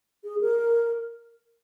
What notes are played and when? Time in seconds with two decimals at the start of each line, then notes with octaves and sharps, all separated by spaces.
0.24 G#4
0.41 A#4